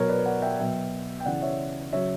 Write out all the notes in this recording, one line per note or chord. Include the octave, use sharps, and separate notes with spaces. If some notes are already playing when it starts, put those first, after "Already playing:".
Already playing: B2 F#3 A#4 C#5
B4 D5
D5 F#5
E5 G5
B2 F#3 E5 G5
G5
C#3 E3 D5 F#5
C#5 E5
C#3 F#3 C#5 E5